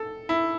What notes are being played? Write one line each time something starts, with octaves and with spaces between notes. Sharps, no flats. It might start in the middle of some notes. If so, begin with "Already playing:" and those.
Already playing: A4
E4